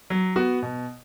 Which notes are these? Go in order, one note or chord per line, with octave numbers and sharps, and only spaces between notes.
F#3
B3 F#4
B2